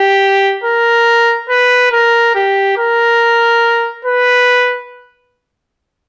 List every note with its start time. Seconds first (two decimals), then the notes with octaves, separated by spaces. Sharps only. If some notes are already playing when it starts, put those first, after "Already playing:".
Already playing: G4
0.64 A#4
1.49 B4
1.92 A#4
2.35 G4
2.77 A#4
4.05 B4